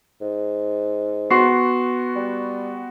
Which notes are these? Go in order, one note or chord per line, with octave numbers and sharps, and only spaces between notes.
G#2
B3 F#4 C6 C#6 C7
G3